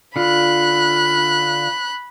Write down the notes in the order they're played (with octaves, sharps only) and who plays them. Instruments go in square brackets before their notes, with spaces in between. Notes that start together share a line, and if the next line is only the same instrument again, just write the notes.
[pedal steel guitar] D3 F4 [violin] B5 F#6